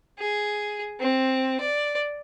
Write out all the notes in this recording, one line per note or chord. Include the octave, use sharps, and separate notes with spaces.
G#4
C4
D5